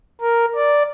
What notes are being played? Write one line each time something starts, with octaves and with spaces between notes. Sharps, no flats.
A#4
D5